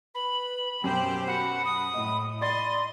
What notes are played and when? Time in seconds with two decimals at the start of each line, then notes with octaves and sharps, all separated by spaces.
0.15 B4 B5
0.84 F#2 B2 G4 C5 G5
1.27 F#4 F#5 B5
1.65 D#6
1.94 A2 D#5
2.41 D5 D#5 B5 C6 A6